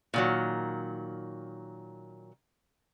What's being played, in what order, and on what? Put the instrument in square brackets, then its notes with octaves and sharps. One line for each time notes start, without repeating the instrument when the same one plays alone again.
[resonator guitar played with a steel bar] A#2 D#3 F#3